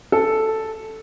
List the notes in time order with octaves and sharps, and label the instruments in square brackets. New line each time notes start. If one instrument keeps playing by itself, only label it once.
[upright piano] A4